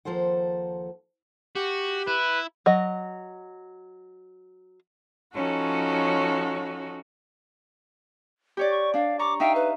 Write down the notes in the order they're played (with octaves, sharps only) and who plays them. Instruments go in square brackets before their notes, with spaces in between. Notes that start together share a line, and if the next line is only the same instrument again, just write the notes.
[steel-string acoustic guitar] D#2 F3 A4 C5 F#5
[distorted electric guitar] F#4 [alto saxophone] G4
[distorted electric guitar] E4 [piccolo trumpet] B4
[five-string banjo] F#3 D#5
[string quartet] F3 C#4 D#4 F#4 A4 C#5
[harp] G4 C#5 D5
[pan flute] C#6
[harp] D4 [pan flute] F5
[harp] A#5 C#6 [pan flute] D6
[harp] D#4 E5 F5 [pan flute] G5
[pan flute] B4